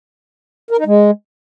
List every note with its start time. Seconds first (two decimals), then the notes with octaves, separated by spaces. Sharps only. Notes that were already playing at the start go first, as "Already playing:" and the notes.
0.71 A#4
0.78 D#4
0.86 G#3